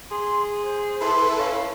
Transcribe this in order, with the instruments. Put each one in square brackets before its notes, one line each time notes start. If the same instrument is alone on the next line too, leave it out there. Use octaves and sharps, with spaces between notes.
[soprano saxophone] G#4 [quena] C6
[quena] C5
[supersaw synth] E4 A4 B4 [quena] C6
[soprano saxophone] C#4 [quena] F5